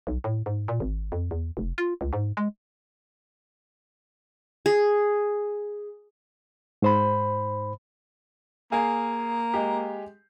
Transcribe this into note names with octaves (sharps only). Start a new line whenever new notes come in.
B1
A2
G#2
A#2
G#1
F2
E2
F1
F4
C#2
G#2
G#3
G#4
G#2 C5 B5
A#3 G#4 F5 G#5
G#3 G4